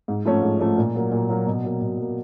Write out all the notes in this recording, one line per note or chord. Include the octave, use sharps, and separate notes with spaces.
G#2
F3 A3 C#4
G#2
F3 A3 C#4
A#2
F#3 A#3
A#2
F#3 A#3
B2
F#3 A#3
B2
F#3 A#3